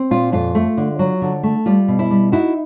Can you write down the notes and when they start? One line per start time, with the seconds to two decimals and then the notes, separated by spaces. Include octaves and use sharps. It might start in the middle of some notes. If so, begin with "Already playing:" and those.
Already playing: C4
0.11 A#2 F4
0.32 F2 F4
0.55 A3
0.77 D3
0.99 F#3
1.22 D3
1.43 A3
1.66 G3 F4
1.88 B2
1.99 E4
2.11 G3
2.32 D#4 E4 F#4